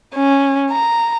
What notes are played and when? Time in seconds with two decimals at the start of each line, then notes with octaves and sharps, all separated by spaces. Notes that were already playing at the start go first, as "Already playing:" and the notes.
0.14 C#4
0.71 A#5